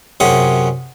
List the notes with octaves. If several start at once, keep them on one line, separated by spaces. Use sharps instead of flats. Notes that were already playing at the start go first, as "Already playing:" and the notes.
F#2 C3 C#4 G#4 F#5